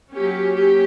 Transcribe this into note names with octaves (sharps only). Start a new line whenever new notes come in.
F#3 A#3 C#4 G4
G4